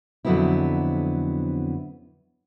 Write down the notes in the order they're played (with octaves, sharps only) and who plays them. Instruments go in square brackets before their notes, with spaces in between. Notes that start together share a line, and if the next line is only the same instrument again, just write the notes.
[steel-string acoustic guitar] F2 D3 F#3 B3 C4 E4